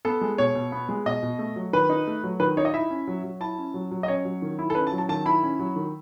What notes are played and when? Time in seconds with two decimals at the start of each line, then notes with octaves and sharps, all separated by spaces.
0.05 B3 A4
0.21 G#3
0.38 B2 C#5
0.55 B2
0.72 B3
0.89 G#3
1.06 B2 D#5
1.23 B2
1.39 A3
1.56 F#3
1.73 D#3 B4
1.90 D#4
2.07 A3
2.23 F#3
2.40 D#3 B4
2.57 D#4 C#5
2.65 D#5
2.74 E4 E5
2.90 C#4
3.07 F#3
3.24 F#3
3.40 E4 A5
3.58 C#4
3.74 F#3
3.91 F#3
4.03 D#5
4.08 C#4 C#5
4.25 F#3
4.42 D#3
4.59 E4
4.70 A4
4.75 C#4 B4
4.87 A5
4.92 F#3
4.98 A5
5.09 D#3 A5
5.26 E4 B5
5.43 C#4
5.59 F#3
5.76 D#3